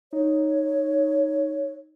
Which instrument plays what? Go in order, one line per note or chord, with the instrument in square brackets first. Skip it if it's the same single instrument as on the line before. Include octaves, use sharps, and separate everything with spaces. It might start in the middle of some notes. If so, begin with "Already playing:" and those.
[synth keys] D#4 [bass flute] C#5